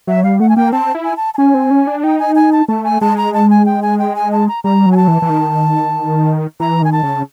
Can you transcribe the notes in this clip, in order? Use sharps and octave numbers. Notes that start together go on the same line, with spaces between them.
F#3 E5
G3 F5
A3 F#5
G#5
A#3 G5
C4 A5
E4
G#5
A5
A5
C#4 G#5
C4
C#4
D4
D#4 G5
G#5
G#5
A5
A3 A5
G#5
G#3 A5
A#5
A5
G#5
G5
G#5
G5
G#5
A5
A#5
G3 A#5
F#3
G#5
A5
E3
E3
D#3
E3 A#5
D#3 G#5
A5
C#3